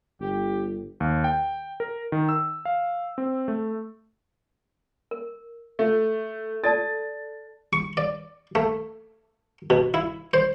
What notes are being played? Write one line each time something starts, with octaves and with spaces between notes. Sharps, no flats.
G1 G4
D#2
G5
A#4
D#3
E6
F5
C4
A3
A#4
A3
A4 D5 A5 A6
C#6
D5
A3
B2
E4
C5